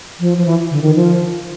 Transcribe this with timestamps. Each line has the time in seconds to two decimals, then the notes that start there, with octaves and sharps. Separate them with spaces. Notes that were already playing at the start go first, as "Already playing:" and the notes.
0.20 F3
0.38 F3
0.46 E3
0.71 D3
0.82 D#3
0.95 F3